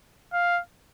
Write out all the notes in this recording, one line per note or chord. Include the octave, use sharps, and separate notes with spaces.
F5